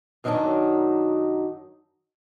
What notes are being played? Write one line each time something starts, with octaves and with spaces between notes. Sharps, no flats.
F#2 D#3 F#3 G3 D4 D#4